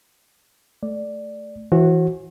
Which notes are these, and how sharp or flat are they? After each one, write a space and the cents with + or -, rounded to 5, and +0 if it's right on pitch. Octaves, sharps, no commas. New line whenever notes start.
A3 +0 D5 +0
E3 +5 F#4 +0 C5 +45